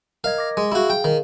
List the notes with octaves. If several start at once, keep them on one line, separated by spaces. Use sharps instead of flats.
A#4 D#5 F5 G#6
D6 A#6
G#3
E4 F#4 G#4 F5
G5
D#3